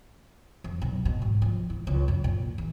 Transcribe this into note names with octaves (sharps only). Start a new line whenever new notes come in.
F2
B1
B2
G#2
F3
E4
C#2
F#2
A#2
E2